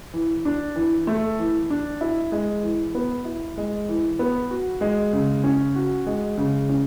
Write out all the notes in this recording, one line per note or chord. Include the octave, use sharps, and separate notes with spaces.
E3
D4
E3
A3
E3
D4
E4
G#3
E3
B3
E4
G#3
E3
B3
F#4
G#3
C#3
C#4
F#4
G#3
C#3
C#4